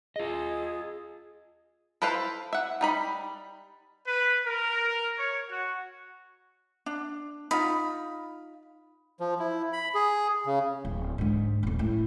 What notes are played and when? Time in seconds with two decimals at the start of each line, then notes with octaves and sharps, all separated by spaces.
0.16 F4 G#4 D#5
2.02 E4 A4 B4 C5 F5
2.53 E5 F#5
2.81 G3 D#4 B5
4.07 B4
4.46 A#4
5.17 C#5
5.49 F#4
6.86 D4
7.51 D#4 F4 B5
9.20 F3
9.39 E4
9.73 B5
9.95 G#4
10.46 C#3
10.85 D1
11.18 G#2 D3
11.63 D#1 D2
11.79 A2